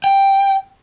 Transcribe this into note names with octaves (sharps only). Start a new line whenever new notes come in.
G5